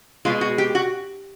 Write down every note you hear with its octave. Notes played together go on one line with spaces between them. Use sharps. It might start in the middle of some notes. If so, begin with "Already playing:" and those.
B2 G#3 F4
F#4
G4
F#4